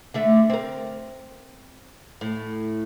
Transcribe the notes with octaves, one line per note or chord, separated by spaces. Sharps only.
D3 A3 E5
C4 A#4
A2